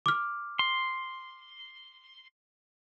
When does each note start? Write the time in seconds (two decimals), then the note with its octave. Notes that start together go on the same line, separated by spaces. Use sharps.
0.06 D6 F6
0.59 C6